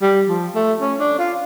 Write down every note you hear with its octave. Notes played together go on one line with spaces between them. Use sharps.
G3
F3
A3
C#4
D4
F4